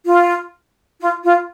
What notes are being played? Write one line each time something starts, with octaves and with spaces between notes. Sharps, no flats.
F4
F4
F4